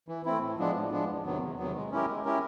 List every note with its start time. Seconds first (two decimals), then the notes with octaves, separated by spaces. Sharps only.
0.08 E3
0.25 A3 C4 E4
0.42 A2
0.58 F3 G#3 B3 D4
0.76 A2
0.91 F3 G#3 B3 D4
1.09 E2
1.25 C3 D#3 F#3 B3
1.41 E2
1.58 C3 D#3 F#3 B3
1.76 G#3
1.92 C#4 E4 G4 A#4
2.08 G#3
2.25 C#4 E4 G4 A#4